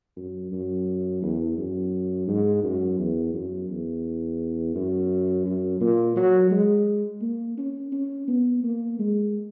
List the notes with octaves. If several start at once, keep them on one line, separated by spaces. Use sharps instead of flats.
F#2
F#2
E2
F#2
G#2
F#2
E2
F#2
E2
F#2
F#2
A#2
F#3
G#3
A#3
C#4
C#4
B3
A#3
G#3